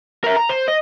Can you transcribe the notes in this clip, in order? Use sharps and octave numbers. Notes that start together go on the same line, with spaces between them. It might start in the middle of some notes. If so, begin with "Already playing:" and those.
A#4 E5
A#5
C5
D#5